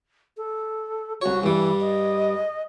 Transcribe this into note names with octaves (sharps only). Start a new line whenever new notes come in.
A4
C2 F#4 C#5
G2 E3 G3
D#5